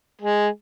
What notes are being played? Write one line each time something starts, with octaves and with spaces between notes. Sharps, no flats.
G#3